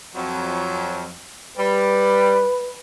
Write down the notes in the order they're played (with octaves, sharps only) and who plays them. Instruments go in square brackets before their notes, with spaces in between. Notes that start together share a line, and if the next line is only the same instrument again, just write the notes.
[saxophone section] F2 F#3
[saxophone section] G3 [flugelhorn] B4